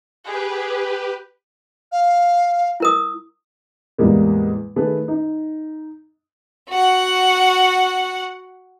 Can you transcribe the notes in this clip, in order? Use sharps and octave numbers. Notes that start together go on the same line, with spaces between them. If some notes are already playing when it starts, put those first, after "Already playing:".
G4 G#4 B4
F5
E4 A#4 D#6
E2 A2 G3 G#3 A#3
D#3 A3 G#4 A4 B4
D#4
F#4 F#5